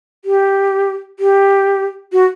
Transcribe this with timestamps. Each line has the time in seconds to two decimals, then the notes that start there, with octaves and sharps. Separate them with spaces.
0.25 G4
1.19 G4
2.13 F#4